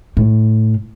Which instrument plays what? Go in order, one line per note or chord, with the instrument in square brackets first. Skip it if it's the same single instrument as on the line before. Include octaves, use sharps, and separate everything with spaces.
[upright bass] A2